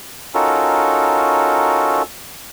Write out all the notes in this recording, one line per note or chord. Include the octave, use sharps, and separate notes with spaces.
C#4 D#4 F4 F#4 A4 A#4